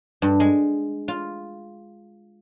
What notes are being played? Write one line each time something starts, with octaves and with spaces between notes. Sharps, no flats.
G2
G#3
F4